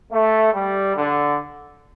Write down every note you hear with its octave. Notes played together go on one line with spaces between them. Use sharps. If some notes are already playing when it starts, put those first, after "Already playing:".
A3
G3
D3